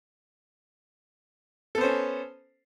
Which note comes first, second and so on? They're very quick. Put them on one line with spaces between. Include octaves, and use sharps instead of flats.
A4 B3 C5 C#4